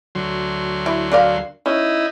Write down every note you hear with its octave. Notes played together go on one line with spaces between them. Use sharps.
D2 F#3 C6
E4
D4 A#4 F5
C#4 D#4 E4